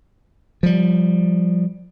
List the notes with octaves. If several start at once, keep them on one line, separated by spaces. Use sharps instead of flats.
F3 G3